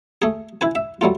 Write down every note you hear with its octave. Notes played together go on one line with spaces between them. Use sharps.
A3 G#4
E4 B4 G#5
E5
F#3 G3 A3 F4